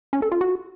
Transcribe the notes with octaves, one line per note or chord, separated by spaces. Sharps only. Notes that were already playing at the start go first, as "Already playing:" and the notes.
C#4
A4
F4
F#4